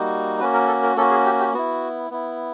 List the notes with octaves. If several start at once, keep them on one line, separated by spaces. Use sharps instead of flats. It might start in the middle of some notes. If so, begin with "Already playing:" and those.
Already playing: G3 A#3 D#4 F#4
A#3 C#4 F#4 B4
A#4
A4
A#4
A#3 C#4 F#4 A4
G#4
G4
G4
B3 E4 F#4
B3 E4